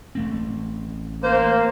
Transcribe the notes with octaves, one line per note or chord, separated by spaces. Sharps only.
A1 A3 C4
A#3 C5